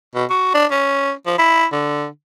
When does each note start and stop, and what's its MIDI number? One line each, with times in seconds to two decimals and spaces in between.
0.15 0.25 47
0.30 0.54 66
0.54 0.65 62
0.71 1.12 61
1.26 1.35 53
1.38 1.65 64
1.72 2.06 50